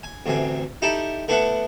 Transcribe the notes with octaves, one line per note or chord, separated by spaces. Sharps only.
G#5
A1 D2 C3 G#5
D#4 E4 G4 A4 D5 E5
A3 B3 D4 E4 A4 F#5